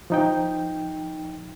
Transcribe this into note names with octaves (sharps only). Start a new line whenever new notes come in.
F3 D#4 G5